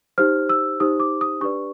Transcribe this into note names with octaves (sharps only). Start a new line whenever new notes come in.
D#4 G4 C5 F6
E6
D#4 G4 C5 D#6
D6
D#6
D4 G4 B4 D5 C#6